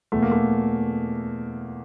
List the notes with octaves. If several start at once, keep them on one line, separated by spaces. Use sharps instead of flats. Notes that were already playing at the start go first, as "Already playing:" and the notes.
E2 B2 A3
A#3
A3